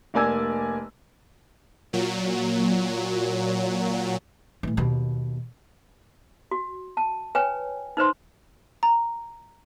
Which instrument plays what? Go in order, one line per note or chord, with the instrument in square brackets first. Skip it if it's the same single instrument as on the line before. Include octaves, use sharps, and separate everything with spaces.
[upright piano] F1 A#3 D5 G#5 E6 G#6
[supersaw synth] A#2 F#3
[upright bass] A2 E3
D#2 B2
[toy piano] F#4
A5
B4 C#5 G5 G#5
D#4 B4 C5 C6
[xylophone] A#5